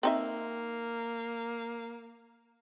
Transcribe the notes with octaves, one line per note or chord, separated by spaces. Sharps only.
A#3 C4 D#4 E5